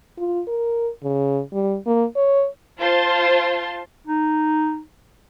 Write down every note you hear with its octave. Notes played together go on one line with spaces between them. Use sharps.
F4
A#4
C#3
G3
A#3
C#5
F4 C5 A5 C6
D#4